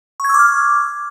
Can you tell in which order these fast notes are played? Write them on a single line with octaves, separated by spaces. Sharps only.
C#6 G#6 E6 D6 F6